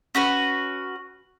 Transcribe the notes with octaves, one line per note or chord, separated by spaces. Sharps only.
C#4 F#4 B4